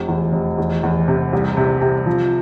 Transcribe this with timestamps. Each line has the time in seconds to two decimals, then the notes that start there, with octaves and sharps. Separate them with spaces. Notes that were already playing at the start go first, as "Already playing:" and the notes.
Already playing: F1
0.08 E2
0.33 F1
0.58 E2
0.83 E2
1.08 C3
1.33 C2
1.57 C3
1.81 C3
2.06 F3